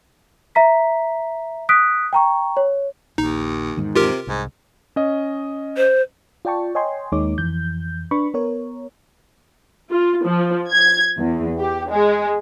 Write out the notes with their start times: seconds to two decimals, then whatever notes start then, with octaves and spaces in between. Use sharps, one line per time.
0.55 E5 A#5 B6
1.69 D#6 F#6 B6 D7
2.13 G5 A#5 C#6
2.57 C#5
3.18 A#1 D#2 D#4
3.77 E2 G#2 D#3
3.95 C3 F4 G4 A#4
4.27 C2 G#2
4.96 C#4 D#5
5.77 C5
6.45 F4 D5 G5 A5 C#6
6.75 C#5 D#5 G5 G#5 C6
7.12 D#2 G#3 A#3 D#4 C#5 D6
7.38 F2 E3 G6
8.11 D4 B4 B5 C#6
8.34 B3 A#4 C#5
9.91 F4
10.25 F3
10.71 G#6
11.18 E2
11.60 G4
11.91 G#3